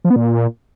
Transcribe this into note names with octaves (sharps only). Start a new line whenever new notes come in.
F3
B3
A#2